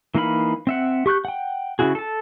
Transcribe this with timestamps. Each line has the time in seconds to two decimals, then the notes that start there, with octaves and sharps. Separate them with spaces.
0.15 E3 A#3 D#4 F5 B5
0.67 C4 E5 F#5
1.06 G4 C#6 F#6 G6
1.25 F#5 G5
1.79 C#3 G3 E4 F#4 G#4
1.95 A4 A5